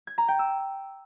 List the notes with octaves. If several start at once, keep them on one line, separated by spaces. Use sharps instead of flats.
G#6
A#5
G5
E6